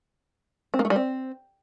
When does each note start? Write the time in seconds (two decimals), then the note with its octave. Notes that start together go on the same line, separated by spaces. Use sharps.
0.74 C4
0.79 A#3
0.85 A3
0.90 G3
0.96 C4